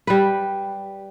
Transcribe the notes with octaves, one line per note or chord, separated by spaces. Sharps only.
G3 B4